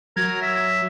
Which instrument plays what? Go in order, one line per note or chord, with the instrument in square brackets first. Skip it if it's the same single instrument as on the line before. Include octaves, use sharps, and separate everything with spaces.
[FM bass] F#3 [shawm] A#4 [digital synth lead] G#6
[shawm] E5